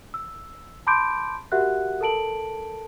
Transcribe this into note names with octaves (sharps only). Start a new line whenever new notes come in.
E6
A5 B5 C6 D6 G6 D7
F#4 G4 A#4 E5 F#5 F#6
A4 A#4 A5 D7 F#7